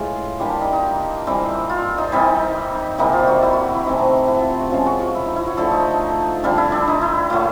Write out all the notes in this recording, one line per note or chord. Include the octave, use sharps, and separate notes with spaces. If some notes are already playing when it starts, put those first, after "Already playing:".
Already playing: A2 E3 G#3 F4 G#4
E3 G3 A#3 D4 G4
F4
D#4
D#4
E3 G3 C4
F4
D#4
E3 G3 C4 D#4
C3 E3 G3 A#3 D#4
F4
F#4
E4
F#4
F#4
E4
C3 E3 A3 C4 D#4
D#4
E4
E4
F4
F4
F#4
C#3 F3 G#3 F4
F#4
F4
E4
D#4
E4
F#4
D3 F3 A3 A4
D#4
D3 G3 C4 F4
E4
D4
D#4
E4
A#2 F#3 A3 E4